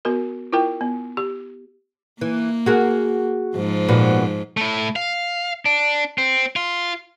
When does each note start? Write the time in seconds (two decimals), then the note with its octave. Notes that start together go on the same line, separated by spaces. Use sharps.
0.05 B3 F#4 A#4
0.53 E4 F4 A#4 G5
0.81 B3
1.17 G4
2.21 E3 A#3
2.66 F#4 G#4 A#4
3.55 G#2 F3
3.89 A#2 B3 F#4
4.57 A3 E4
4.96 F5
5.66 D4
6.18 C4
6.56 F4